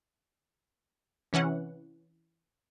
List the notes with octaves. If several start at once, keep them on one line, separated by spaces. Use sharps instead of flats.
C3 E3 C#4 F#5